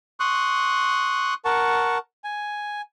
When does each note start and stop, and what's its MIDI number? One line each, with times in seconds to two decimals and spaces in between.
0.20 1.34 84
0.20 1.34 85
0.20 1.34 87
0.20 1.34 90
1.45 1.98 70
1.45 1.98 78
1.45 1.98 81
1.45 1.98 85
2.24 2.82 80